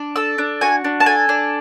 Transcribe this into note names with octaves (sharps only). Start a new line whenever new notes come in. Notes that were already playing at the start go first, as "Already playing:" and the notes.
Already playing: D4
A4 E6
D4
F#4 G#5
D4
A5
A4 G#5
D4